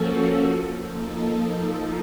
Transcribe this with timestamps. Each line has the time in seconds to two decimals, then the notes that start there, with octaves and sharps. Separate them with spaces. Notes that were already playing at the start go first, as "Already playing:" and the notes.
Already playing: F3 A#3 C#4 F#4 A4
0.77 F3 A#3 D#4 A4